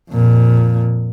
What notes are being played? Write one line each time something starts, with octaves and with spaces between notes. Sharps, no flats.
F2 A#2